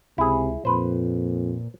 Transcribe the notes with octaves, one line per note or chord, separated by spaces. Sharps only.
C#2 C3 E4 G#4
F2 A#2 B4 C5